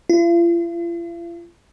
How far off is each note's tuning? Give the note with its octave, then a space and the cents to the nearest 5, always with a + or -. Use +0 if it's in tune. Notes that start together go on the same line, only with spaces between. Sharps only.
F4 -45